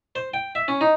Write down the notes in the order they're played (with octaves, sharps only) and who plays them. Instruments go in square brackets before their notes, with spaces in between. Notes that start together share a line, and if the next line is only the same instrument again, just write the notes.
[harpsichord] C5
G5
E5
C#4
D#4